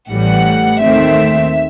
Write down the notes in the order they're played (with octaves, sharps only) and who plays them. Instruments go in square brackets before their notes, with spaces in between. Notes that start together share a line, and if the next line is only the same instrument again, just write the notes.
[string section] A1 A2 E3 G3 F#5
D#2 D#3 A3 C4 E5